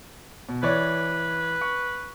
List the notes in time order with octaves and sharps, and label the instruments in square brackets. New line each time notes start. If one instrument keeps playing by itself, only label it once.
[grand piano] B2
[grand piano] E3 C#5 D5 [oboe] B4
[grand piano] C#6